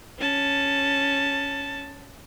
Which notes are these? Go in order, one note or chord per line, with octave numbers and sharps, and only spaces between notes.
C#4 A5